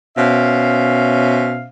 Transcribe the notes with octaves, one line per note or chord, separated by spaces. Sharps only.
B2 C#4 C5 E5 F5